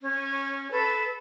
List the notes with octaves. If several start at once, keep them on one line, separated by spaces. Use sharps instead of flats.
C#4
A4 B4